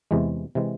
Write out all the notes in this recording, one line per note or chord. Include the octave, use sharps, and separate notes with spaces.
E2 C3 E3 G#3
C3 E3 G#3